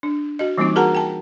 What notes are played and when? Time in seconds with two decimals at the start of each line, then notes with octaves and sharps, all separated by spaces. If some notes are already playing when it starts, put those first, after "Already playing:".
0.03 D4
0.39 F#4 D#5
0.58 E3 G3 A#3 C4 D#4 F4
0.76 F#4 G#4 A#4 F#5 A5 A#5
0.95 G5 A5